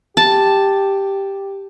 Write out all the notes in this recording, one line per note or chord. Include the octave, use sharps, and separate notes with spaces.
G4 A5